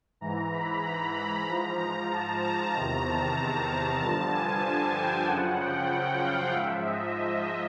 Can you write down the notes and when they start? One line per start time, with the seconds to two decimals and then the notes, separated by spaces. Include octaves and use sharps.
0.21 G#2 E3 A#5
0.53 B5
0.84 A#5
1.16 B5
1.47 G#2 F3 A#5
1.78 A#5
2.11 A5
2.42 A#5
2.73 E2 C3 D#3 A#5
3.05 A5
4.00 G2 D3 F3 A5
4.32 G#5
4.95 G5
5.26 F#2 C#3 F3 F#5
5.59 G5
5.90 F#5
6.22 F5
6.53 G#2 F3 E5
6.85 D#5
7.16 D#5